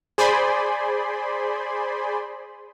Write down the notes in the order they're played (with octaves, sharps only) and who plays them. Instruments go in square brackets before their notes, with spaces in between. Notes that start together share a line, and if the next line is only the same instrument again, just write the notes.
[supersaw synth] G#4 C5 D5 G#5 B5 C6